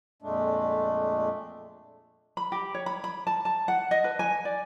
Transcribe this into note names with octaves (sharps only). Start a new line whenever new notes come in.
F2 A#2 G#3 A3 D4
B5
G4
C#5
B5
B5
A5
A5
F#5
D#5
B4
G#5
D5